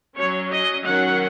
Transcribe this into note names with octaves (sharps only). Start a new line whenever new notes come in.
F#3 C#4 C#5
D#5
D#3 F#3 C#4 F#5